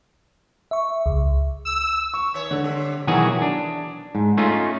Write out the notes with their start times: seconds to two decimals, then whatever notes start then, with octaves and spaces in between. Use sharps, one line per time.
0.71 E5 C#6
1.06 C#2
1.65 E6
2.14 C#6
2.34 D#3 C#5
2.51 D3
2.64 C3 G3
3.07 B2 D#3 E3 F#3 F#4 G#4
3.42 D4
4.15 G#2
4.38 A3 C#4 D#4 F4